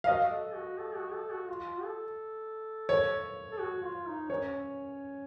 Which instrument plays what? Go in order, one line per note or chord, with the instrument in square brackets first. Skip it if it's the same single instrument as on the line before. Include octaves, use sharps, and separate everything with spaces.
[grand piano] F5
[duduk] F#4 [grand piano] D#5
[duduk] F#4
A4
F#4
A4
F#4
A4
F#4
F4
A4
[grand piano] C#5
[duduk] A4
F#4
F4
D#4
[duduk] C#4 [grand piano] C#5